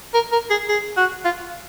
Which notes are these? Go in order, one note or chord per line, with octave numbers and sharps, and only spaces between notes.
A#4
A#4
G#4
G#4
F#4
F4